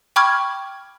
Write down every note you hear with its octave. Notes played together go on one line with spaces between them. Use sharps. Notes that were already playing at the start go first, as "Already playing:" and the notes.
G5 B5 C#6 D6 F6 G#6